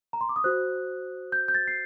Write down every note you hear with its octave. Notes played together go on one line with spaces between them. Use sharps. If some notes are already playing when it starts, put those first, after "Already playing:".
A#5
C6
D6
D#6
F#4 C5 F#6
G6
G6
A6
C7